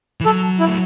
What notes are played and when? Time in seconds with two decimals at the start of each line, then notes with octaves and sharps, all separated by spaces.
0.21 E3
0.25 F#3 A4
0.60 E4
0.67 A3